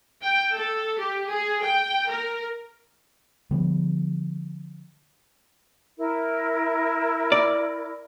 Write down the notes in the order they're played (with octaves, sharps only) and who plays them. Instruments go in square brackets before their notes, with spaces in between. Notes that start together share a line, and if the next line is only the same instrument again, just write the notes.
[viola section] G5
A4
G4
G#4
G5
A#4
[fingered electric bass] D3 F3 G3 B3
[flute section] E4 A#4
[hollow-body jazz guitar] D5